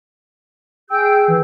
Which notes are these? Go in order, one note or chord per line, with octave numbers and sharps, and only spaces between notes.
G#4 G5 E6 G6
E3